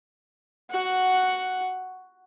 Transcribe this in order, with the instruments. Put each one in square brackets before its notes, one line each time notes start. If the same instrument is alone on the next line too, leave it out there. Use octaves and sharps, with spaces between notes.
[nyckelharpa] F#4 F#5